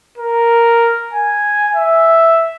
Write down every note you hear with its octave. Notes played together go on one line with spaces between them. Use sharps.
A#4
G#5
E5